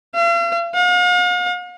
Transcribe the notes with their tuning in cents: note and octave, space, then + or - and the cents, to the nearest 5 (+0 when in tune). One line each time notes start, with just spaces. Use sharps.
F5 -45
F5 +45